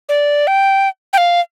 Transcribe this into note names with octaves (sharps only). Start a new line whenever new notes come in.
D5
G5
G5
F5